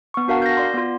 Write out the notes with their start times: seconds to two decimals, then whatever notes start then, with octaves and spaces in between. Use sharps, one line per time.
0.14 B3 C#6
0.28 D4 F#4 A#4 F5 F#5 A5
0.42 G6 A#6
0.57 D5 C6
0.74 B3 F4